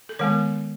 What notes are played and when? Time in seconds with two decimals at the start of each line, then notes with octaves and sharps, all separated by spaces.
0.09 A4
0.19 D#3 G#3 B3 A#4